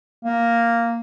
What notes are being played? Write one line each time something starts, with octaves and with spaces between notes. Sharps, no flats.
A#3